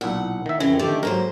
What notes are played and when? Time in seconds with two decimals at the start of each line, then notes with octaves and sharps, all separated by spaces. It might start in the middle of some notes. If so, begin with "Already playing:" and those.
0.01 B1 A#2 E4 F#5
0.46 D#3 E5
0.60 F2 C#3 E3 A#4 G5
0.79 D3 D#3 A3 G4 A4
1.03 G#2 F#3 A#3 A#4 C5